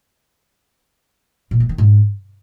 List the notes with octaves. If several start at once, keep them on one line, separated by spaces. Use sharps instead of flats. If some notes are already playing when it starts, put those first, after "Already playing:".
A#2
G#3
D#3
G#2